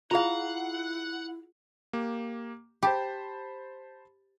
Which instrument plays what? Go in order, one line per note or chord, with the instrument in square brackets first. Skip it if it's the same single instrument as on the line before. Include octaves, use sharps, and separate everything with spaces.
[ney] E4 [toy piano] F4 G#4 [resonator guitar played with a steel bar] F5 A#5 [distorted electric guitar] F#5
[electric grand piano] A#3 G4
[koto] G4 [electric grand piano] C5 A5 B5